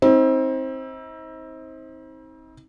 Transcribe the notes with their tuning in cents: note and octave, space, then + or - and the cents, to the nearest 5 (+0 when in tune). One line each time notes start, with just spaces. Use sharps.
C4 +15 D#4 +40